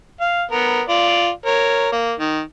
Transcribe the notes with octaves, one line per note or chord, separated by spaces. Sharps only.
F5
B3 A#4
F4 D5
A#4 C#5
A#3
D#3